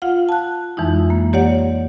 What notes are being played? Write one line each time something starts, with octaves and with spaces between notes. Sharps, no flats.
F4 F5 F#5
A5 F#6
F2 E3 G#3 D#4 E4
A#3
G4 C#5 D5 F#5